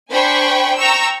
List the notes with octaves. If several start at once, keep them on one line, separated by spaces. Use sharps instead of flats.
D4 C5 G5 G#5 B5 C#6
G5 A#5 C#6 E6